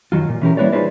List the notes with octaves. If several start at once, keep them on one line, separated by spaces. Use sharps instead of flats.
F#2 D#3 F#3 F4
A#2
E3 C#4 G4 A#4
G3 A#3 E4 B4 C#5 D5
D#4 F4 G#4 B4 C5 D5